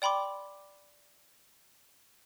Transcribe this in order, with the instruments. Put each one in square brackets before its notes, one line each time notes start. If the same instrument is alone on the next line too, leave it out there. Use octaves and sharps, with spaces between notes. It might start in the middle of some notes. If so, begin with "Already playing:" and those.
[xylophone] D5 G5 B5 C6 D6